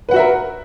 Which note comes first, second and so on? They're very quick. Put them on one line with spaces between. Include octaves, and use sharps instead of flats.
B4 F#5 F#4 E5 A#4